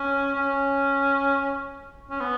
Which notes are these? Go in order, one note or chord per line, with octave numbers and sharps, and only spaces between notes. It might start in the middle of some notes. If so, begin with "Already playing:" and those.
Already playing: C#4
C#4
C#4
B3